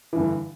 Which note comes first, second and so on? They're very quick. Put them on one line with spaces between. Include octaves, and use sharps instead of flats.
E3 G2 D3